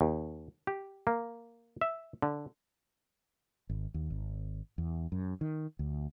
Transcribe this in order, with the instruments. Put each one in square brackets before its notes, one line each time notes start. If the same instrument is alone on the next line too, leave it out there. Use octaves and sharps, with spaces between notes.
[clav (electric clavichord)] D#2
G4
A#3
E5
D3
[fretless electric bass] G#1
D#2
G#1
E2
F#2
D#3
D2